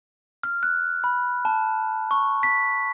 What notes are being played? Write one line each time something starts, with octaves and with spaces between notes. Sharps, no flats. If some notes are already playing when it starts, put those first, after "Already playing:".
F6
F#6
B5
A5
C#6
B6